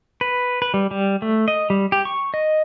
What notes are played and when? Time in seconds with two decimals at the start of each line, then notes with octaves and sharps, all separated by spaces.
0.21 B4
0.62 B4
0.74 G3
0.91 G3
1.22 A3
1.48 D#5
1.70 G3
1.92 G4
2.05 C#6
2.34 D#5